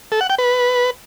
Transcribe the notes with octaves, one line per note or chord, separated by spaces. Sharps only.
A4
F#5
G5
B4